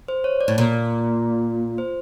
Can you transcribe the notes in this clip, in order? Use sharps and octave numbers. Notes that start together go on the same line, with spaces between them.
C5
C#5
D5
A2
A#2
C5